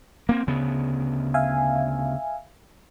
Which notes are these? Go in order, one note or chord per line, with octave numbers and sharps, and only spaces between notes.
A#3 C4
D2 C#3 B3
E5 F5 G#5